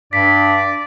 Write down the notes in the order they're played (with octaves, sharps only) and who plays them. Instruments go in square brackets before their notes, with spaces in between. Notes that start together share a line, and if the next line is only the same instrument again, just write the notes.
[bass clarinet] G2 [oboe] D5 [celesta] B6